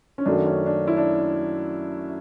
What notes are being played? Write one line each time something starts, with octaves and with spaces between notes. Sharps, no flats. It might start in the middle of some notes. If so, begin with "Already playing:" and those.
C#4
F#2 D#3 F#3 A3 D4
C#4
D4
E4
D4